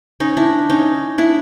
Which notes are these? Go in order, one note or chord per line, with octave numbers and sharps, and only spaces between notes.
C#4 D#4
D4 E4
C#4 D#4
D4 E4